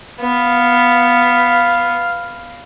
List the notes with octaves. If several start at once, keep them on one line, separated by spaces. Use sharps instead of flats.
B3 F5